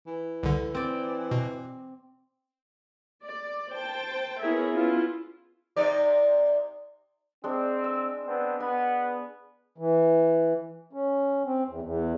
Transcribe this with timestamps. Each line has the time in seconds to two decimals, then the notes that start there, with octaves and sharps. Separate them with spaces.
0.07 E3
0.43 C2 D3
0.74 C4 D5
1.31 B2
3.24 D5
3.73 C5 G5 A5
4.40 B3 E4 G#4 A#4 C#5 E5
4.74 B3 C#4 E4 F4
5.76 C3 D#4 D5
7.44 G#3 C4 D4
7.84 E6
8.25 B3 C4 D4
8.60 B3 G#5
9.78 E3
10.93 C#4
11.45 C4
11.67 E2
11.82 E2